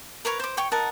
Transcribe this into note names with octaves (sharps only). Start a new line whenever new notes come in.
A#4 B4 C#5 A#5
C5 D6
C#5 G5 C#6
D#4 A#4 F#5 A5